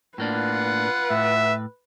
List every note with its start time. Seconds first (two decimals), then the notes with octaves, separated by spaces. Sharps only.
0.18 A2 A#3 D4 F4 B4 F#5
1.10 A2 E5